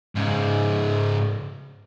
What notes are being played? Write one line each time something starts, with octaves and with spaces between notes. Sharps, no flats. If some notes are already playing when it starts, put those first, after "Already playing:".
G#2 C#3